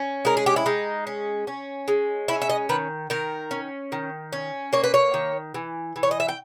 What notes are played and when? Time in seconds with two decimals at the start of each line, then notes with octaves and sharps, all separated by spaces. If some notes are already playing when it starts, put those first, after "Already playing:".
Already playing: C#4
0.25 G#3 A#4
0.37 G#4
0.46 G4
0.56 E4
0.66 G#3 D#4
1.07 C#4
1.47 C#4
1.88 G#3
2.28 C#4 E4
2.42 E5
2.50 D#5
2.69 D#3 B4
3.10 D#3 A#4
3.51 C#4
3.92 D#3
4.32 C#4
4.73 A#3 C#5
4.84 B4
4.94 C#5
5.14 D#3
5.54 E3
5.96 E3
6.03 C#5
6.11 D#5
6.20 E5
6.28 G5